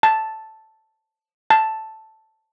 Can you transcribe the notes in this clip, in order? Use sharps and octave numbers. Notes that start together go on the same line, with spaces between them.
A5
A5